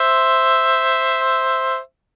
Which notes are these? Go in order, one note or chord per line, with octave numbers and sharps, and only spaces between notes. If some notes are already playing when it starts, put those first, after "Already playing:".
Already playing: C5 E5